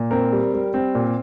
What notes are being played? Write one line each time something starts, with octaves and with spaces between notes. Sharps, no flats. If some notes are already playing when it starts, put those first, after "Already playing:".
Already playing: A#2
C4 A#4
G3
G3
C4
A#2